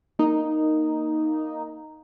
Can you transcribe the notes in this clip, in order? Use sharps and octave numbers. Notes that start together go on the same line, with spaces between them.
A#3 D#4